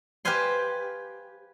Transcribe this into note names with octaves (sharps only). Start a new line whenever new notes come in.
G4 B4 C5 F5 G#5 C6